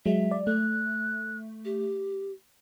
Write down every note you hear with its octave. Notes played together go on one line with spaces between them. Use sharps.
F#3 G#3 E5
D5
A3 F#6
G4